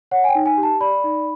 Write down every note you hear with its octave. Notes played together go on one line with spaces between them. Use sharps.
C#5 F#5
G#5
G5
D#4
G#5
G4
A5
D5 B5
D#4